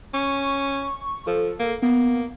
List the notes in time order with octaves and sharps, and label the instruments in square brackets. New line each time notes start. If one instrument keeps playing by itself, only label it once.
[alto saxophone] C#4 [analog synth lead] C#6
[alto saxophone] F3 [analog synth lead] A4
[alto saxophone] A#3
[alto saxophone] A#3 [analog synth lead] B3